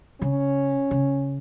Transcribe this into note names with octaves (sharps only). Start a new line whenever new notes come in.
C#3 C#4
C#3